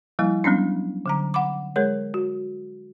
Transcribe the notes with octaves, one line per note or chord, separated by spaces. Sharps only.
F3 G3 A#3 E4
F#3 G3 B3 C#4 D4
D3 F#3 A#5
F#5 B5 D6
G#3 G#4 A#4 C#5
F#4